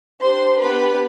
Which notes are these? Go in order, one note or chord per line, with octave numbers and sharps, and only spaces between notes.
D4 G4 C5 C6
B3 D4 G4 B4 B5